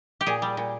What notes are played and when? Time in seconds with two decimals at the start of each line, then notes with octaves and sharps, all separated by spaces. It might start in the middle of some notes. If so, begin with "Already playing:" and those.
0.21 G4
0.26 A#2 G#4
0.42 G3
0.57 A#2